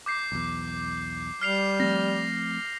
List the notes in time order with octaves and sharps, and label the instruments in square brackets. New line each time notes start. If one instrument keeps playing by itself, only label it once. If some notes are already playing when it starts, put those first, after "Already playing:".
[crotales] D6 G6 C7
[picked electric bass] B1 E2
[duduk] G3 [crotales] F6 C7 F7
[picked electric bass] F3 A3 C4 [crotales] A#6